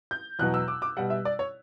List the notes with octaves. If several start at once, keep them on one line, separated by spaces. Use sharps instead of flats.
G6
E2 B2 F#3 F#6
E6
D6
D6
B2 G3 F#5
E5
D5
C#5